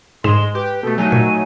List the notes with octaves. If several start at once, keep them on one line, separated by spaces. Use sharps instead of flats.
G#2 G#3 C6 E7
G4 B4
B2 A3 A4
F#3 A3 D#4 G#5
A#2